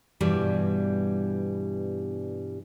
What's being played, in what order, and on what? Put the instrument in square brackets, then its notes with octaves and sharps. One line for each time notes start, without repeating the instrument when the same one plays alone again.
[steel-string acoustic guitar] G2 B2 E3 G3